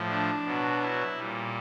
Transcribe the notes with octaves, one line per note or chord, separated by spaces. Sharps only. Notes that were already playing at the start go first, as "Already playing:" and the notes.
Already playing: A2 F3
D4
B2 F#3
E4
A#2 G3